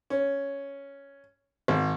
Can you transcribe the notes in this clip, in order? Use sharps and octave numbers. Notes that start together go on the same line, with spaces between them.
C#4
G#1